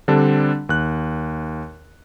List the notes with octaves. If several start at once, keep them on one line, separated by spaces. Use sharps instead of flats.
D3 G3 C4 D4
D#2 F#6